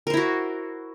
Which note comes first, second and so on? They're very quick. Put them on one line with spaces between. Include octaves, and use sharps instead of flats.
A#4 C5 E4 F#4